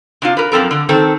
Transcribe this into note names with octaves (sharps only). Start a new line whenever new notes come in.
C3 D4 F4
A#4 B4
F#2 F3 C4 A4 A#4
D3
D#3 C4 A4